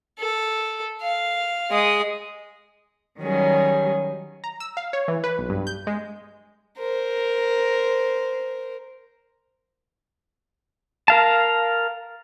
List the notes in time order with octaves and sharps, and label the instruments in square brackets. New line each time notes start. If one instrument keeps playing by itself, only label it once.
[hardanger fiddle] A4
F5
G#3 D#6
[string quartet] D#3 F#3 G3 C#4 G#4
[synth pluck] A#5
E6
F5
C#5
E3
B4
B1
G2
G6
G#3
[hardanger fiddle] A#4 C5
[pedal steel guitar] A#4 F5 A5